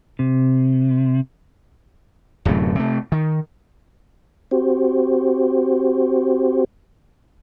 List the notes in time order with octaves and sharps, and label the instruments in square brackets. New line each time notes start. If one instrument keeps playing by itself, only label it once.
[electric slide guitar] C3
[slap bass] D1 F#2 C3 A3
C3 A3
D#3
[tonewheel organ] C4 F#4 G4 C5